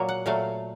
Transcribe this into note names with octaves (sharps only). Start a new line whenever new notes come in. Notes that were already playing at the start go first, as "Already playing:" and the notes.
Already playing: A#2 F#3 A#3
F#5
A#2 F#3 A3 F5